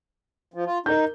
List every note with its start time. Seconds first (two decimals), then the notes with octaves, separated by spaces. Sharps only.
0.54 F3
0.66 F4
0.86 D#4 A#4 G6